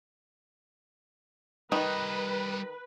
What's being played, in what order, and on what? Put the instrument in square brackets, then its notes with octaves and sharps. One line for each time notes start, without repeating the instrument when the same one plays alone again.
[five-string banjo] D#3 D#4 [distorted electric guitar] G3 D#5 [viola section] B4